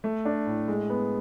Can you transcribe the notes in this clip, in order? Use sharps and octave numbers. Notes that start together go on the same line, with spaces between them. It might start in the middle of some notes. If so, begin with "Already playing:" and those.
A3
D4
A2
G#3
B3